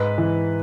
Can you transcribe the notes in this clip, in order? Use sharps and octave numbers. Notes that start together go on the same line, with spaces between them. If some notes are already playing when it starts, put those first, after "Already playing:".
Already playing: G#2 B4
E3